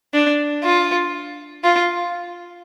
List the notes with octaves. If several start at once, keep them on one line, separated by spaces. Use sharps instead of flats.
D4
F4
F4